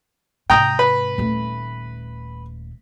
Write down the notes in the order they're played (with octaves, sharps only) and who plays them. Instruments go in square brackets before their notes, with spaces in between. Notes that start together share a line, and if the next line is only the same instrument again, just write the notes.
[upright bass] G#2 C3 [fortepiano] G5 A#5 D#6
[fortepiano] B4
[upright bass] D#1 A3